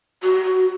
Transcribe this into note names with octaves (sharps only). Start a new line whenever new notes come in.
F#4